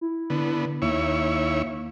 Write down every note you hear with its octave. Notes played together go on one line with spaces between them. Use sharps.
E4
D3 B3
D#2 A#3 E4 C#5